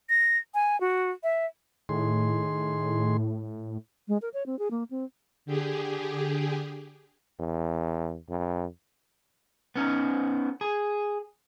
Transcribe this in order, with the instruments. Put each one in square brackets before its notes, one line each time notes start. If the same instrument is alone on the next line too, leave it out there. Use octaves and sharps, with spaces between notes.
[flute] A#6
G#5
F#4
E5
[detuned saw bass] A2 [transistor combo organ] D#3 G#4 C6
[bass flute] G#3
A#4
C#5
C4
G#4
A#3
C4
[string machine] D3 G4 G#4
[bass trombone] E2
F2
[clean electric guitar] B3 C#4 D#4
G#4